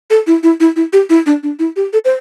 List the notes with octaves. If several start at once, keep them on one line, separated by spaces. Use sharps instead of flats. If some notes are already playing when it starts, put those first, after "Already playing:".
A4
E4
E4
E4
E4
G4
E4
D4
D4
E4
G4
A4
C5